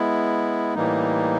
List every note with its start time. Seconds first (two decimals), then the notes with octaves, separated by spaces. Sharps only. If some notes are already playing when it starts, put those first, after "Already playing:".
Already playing: G#3 B3 E4
0.75 A2 E3 G3 A#3 D#4